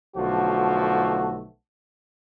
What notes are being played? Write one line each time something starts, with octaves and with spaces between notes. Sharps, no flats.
B1 D3 F3 A3 F#4